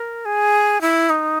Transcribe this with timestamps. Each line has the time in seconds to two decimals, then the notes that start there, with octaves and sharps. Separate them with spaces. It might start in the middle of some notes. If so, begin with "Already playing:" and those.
Already playing: A#4
0.25 G#4
0.81 E4
1.10 D#4